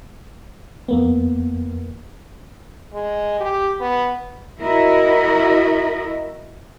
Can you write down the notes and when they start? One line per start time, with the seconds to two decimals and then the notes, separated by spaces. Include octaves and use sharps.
0.88 F2 A#3 B3
2.94 G#3
3.40 G4
3.81 B3
4.61 E4 F#4 A#4 D#5 E5